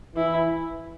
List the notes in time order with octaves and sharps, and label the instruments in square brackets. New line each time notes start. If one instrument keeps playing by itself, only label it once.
[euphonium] E3 [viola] E4